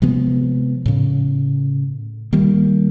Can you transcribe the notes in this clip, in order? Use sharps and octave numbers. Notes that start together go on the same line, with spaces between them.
C3 F3 G#3 B3
A2 C#3
D#3 G3 A#3